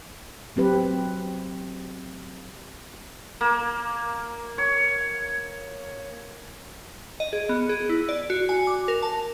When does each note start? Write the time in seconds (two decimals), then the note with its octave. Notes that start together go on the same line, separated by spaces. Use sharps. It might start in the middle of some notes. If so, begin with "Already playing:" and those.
0.56 F#3 C4 G4 B4
3.41 A#3
4.58 C#5
7.20 D#5
7.33 G#4
7.49 B3
7.69 G#4
7.89 E4
8.09 D5
8.30 F#4
8.49 G#5
8.67 D6
8.88 A#4
9.03 A5